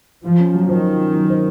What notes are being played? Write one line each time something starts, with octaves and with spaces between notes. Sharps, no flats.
F3 F4
C#4
F#3
D#3 C5
F4
C#4
F#3
C5